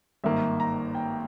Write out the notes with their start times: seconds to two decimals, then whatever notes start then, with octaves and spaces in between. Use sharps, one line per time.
0.24 G#1 G2 D#3 A#3 E5
0.60 A#5
0.95 G5